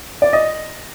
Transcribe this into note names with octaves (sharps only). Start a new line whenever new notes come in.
D5
D#5